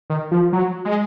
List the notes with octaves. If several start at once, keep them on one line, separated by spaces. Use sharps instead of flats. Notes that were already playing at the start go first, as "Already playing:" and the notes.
D#3
F3
F#3
G#3